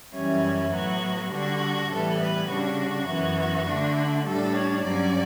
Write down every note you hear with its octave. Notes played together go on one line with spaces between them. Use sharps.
F#2 E3 G3 C#4 E4
A2 F#3 B3 F#4
D3 G3 D4 F#4
A2 E3 G3 B3 A4
B4
C#3 G3 D4 F#4
F#2 E3 B3
D3 A3 D4
A2 G3 D4 A4
C#5
G2 F#3 C#4 D5